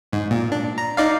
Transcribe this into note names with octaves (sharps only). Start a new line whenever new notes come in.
G#2
A#2
D4
A#5
D#4 D5 F5